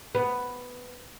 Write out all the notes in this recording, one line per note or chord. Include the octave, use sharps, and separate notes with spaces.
B3